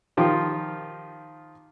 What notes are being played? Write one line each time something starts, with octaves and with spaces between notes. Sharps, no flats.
D#3 F3 F4 G4 A#4